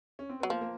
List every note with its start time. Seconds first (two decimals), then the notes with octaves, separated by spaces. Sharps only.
0.19 C#4
0.30 C4
0.40 F#3 B3
0.50 F3 A#3
0.61 A#3